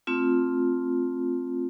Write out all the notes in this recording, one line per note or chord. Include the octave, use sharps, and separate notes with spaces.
A3 C4 F4